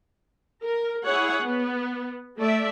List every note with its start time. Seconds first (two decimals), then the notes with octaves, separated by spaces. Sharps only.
0.62 A#4
1.05 E4 G#4 C#5 F#5
1.44 B3
2.38 A3 D5 E5